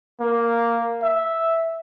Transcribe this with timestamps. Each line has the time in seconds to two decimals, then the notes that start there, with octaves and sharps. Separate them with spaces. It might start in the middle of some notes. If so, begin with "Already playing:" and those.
0.20 A#3
1.02 E5